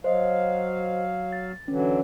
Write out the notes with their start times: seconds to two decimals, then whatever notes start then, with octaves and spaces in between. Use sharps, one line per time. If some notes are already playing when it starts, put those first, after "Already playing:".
0.04 F#3 C5 D#5 F5
1.32 A6
1.68 D3 E3 F#3 C#4